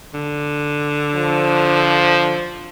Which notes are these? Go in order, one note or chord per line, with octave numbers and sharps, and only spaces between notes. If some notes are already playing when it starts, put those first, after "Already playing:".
D3
F3